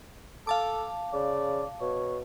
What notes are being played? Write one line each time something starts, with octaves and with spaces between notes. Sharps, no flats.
A4 F5 A5 D6
C#3 D5
B2 C#5